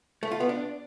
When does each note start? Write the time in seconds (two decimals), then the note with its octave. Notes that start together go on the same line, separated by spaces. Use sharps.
0.23 A3
0.32 F4
0.40 B3
0.49 D4